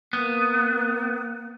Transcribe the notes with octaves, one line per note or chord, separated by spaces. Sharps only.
A#3 B3